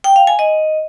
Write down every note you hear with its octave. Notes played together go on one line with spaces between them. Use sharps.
G5
F5
G#5
D#5